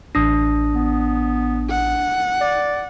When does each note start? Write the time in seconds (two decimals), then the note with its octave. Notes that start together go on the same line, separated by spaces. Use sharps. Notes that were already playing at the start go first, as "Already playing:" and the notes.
0.15 A1 D4 D#6 A#6
0.75 B3
1.70 F#5
2.41 D5